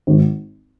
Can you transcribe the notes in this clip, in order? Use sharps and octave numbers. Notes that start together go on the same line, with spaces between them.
G#1